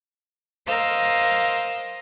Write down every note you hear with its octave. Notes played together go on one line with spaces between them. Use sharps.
A#4 C5 D#5 F5 E6